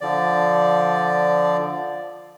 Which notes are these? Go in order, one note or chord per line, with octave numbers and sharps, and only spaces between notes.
D3 F3 D5